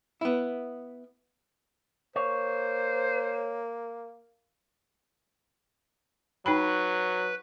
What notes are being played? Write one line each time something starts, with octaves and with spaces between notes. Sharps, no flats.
B3 E4
A#3 C5 C#5
F#3 D#4 B4 G5 B5